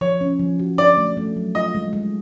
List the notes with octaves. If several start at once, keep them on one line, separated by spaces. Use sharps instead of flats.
F3 C#5
C#4
F3
F#4
D4 D5
A3
A3
F#3
F4 D#5
G#3
G#3